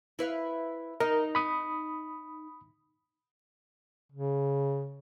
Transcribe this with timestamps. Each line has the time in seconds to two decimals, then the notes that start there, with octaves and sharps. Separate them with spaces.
0.19 E4 B4 F5
1.00 D#4 A#4
1.35 B5 D#6
4.12 C#3